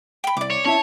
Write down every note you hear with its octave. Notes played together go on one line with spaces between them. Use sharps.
G5 B5
C2 D5 D6
C#5
C#4 E4 C#5 E5 A5